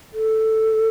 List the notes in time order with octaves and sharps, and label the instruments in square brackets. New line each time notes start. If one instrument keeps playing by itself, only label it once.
[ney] A4